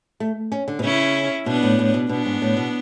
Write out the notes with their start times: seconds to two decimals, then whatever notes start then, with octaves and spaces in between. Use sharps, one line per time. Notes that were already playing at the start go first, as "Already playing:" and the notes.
0.20 A3
0.52 C#4
0.68 D3
0.79 B2
0.84 C#3 C#4 E4
1.46 B2 B3 D4
1.63 A2
1.79 A2
1.94 B2
2.09 B2 B3 D4
2.26 G#2
2.42 A2
2.57 B2